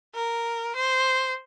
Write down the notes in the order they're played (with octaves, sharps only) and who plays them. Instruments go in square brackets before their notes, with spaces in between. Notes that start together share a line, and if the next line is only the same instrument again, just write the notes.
[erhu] A#4
C5